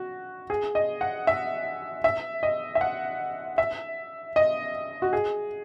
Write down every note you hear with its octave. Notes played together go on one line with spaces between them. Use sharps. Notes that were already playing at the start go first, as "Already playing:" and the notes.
Already playing: F#4
G#4
D#5
F#5
E5
E5
D#5
E5
F#5
E5
D#5
F#4
G#4